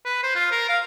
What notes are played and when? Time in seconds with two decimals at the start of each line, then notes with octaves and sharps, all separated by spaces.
0.05 B4
0.23 C5
0.35 F4
0.51 A#4
0.69 F5